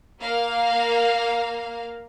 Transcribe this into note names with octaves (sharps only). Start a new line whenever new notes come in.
A#3 F5